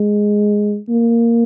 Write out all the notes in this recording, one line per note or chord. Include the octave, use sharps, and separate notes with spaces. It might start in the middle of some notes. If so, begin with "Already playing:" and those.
Already playing: G#3
A#3